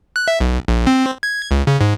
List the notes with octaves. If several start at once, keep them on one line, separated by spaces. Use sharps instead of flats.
F#6
E5
B1
A#1
C4
G#6
C#2
C#3
G#2